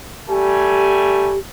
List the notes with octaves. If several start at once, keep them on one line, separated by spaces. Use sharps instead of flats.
G3 A3 G4 G#5